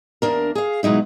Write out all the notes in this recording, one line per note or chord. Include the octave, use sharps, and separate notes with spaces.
E2 A#3 D4 A#4
G#4 F5
B2 F#3 G#3 D#4 E4